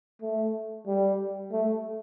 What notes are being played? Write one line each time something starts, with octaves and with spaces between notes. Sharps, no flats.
A3
G3
A3